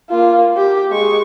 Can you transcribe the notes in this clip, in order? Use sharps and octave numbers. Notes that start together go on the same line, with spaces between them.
A#3 F4
G4
G#3 C#6